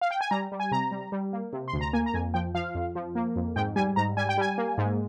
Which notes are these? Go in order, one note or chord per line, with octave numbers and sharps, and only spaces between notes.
F5
G5
G#5
G3 A#5
G3
G#5
C3 A#5
G3
G3
A#3
C3
C6
D2
A#5
A#3 G#5
A#5
F2 G#5
F3 G5
F3 F5
F2
F3
A#3
F2
G#2 G5
G3 G#5
G#2 A#5
G3 G#5
G5
G3 G#5
A#3
G#2